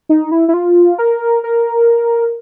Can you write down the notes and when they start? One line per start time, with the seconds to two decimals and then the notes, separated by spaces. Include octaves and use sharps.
0.09 D#4
0.31 E4
0.48 E4
0.54 F4
0.98 A#4
1.44 A#4